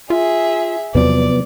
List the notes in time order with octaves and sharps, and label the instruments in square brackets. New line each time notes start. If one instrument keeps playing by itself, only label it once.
[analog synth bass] F4 [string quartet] G#4 E5
[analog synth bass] E2 [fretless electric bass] C3 F3 F#3 [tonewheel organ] B3 [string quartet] D5